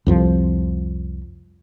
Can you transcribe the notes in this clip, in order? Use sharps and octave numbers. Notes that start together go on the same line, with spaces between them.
C2 F2 F3